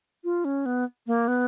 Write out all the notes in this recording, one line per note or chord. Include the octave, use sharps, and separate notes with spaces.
F4
C#4
B3
A#3
B3